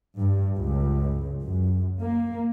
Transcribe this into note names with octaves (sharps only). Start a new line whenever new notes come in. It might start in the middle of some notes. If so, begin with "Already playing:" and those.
G2
C#2
F#2
A#3